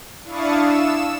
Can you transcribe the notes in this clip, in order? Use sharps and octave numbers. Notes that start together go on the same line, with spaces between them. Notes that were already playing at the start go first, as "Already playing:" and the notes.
D4 E4 F5 C#6 D#6 A6
E6 E7